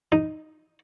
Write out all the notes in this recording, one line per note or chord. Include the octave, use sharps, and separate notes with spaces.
D#4